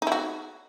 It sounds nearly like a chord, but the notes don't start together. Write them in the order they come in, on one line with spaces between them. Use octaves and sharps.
D#4 E4 F#4